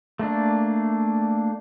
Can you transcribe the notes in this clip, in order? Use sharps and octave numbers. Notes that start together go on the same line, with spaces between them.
A3 A#3 D4